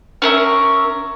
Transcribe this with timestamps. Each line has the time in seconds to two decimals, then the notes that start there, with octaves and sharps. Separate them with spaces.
0.22 C#4 A#4 E5